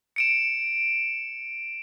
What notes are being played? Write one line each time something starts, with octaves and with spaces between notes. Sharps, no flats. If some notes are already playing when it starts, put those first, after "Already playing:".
C#7 D7 E7